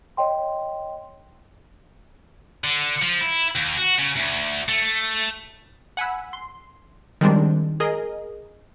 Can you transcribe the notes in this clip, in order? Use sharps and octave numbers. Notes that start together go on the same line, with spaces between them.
C#5 D#5 G5 C6
D3
F3
E4
D#2
F#4
C#3
D2
A3
F#5 G#5 B5 E6
C6
D#3 F3 G3 G#3 C4 D4
G#4 A#4 D#5